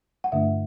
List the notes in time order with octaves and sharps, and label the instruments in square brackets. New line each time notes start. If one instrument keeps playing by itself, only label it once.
[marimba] F#5
G2 D3 A3 D4 E5